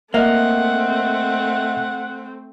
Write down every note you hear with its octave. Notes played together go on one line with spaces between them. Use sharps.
A3 A#3 C4 D#5 E5 F#5